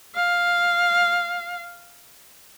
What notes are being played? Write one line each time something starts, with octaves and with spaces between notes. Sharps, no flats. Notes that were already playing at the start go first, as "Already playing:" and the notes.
F5